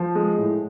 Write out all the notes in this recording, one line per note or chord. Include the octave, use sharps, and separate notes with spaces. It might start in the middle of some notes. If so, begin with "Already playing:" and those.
Already playing: F3
G#3
A2